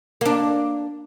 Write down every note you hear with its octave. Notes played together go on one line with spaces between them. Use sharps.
A#3 D4